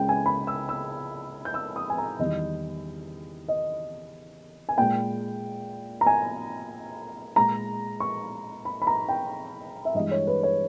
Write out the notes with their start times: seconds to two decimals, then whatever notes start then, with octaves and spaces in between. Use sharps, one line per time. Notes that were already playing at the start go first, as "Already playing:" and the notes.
Already playing: C#2 C#3 G#3 G5
0.09 G#5
0.26 B5
0.47 E6
0.69 E6
1.45 G6
1.54 E6
1.76 D#6
1.90 G#5
1.98 A#5
2.19 E2 D#3 G3 D#5
3.48 D#5
4.69 G#5
4.78 A#2 G#3 G5
6.01 A#5
6.07 G#5
7.36 A#2 G#3 A#5
8.00 C#6
8.65 B5
8.82 B5
8.87 A#5
9.09 G5
9.85 E5
9.94 G2 E3 G#3 D#5
10.11 C#5
10.27 B4
10.43 C#5